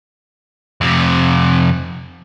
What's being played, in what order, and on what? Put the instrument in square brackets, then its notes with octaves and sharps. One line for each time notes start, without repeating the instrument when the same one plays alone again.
[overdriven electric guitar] F2 C3